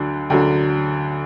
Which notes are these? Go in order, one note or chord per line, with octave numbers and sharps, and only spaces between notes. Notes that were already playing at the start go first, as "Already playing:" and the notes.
Already playing: D2 D3 F#3
D2 D3 F#3